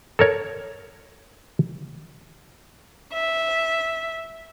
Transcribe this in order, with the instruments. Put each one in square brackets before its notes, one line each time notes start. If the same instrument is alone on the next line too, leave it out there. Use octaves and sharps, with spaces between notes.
[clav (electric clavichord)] A4 A#4 C#5
[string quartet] E5